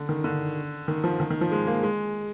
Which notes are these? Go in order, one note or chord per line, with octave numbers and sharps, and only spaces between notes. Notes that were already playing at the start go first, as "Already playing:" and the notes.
Already playing: D3
D#3
D3
D#3
F3
D#3
D#3
F3
G#3
A#3
G#3